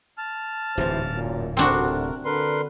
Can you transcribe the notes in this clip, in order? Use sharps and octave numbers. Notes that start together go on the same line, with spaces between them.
A5 F6
D1 G#2 C3 E3 C5
F#2 A#2
D2 C3 C4 D4 F#4 A#4
D3 A#4 B4 C6